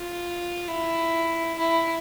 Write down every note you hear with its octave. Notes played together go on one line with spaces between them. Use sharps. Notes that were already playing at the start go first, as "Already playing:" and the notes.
Already playing: F4
E4
E4